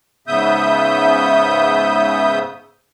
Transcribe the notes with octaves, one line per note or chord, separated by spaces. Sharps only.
G#2 C#3 B3 E5 D#6 G6